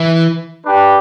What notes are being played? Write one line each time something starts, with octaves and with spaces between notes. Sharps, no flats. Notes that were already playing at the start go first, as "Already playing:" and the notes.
Already playing: E3
D4 G4 B4 G5